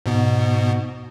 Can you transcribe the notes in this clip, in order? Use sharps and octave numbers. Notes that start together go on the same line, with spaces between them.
G#2 B2 B3